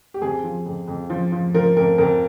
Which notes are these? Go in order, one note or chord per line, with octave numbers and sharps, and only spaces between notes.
G4
F2 G#4
F3
F2
F2
F3
F3
F3 A#4
F2 A#4
F2 A#4